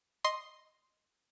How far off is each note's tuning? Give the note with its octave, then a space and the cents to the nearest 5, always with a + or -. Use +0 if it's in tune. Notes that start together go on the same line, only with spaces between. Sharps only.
D#5 +0 C6 +5